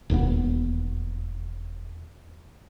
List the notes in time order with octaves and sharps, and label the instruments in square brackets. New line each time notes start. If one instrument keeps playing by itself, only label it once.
[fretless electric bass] E1 D#2 B2 B3